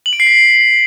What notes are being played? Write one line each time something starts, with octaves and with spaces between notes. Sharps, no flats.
F#7
D7
C7
B6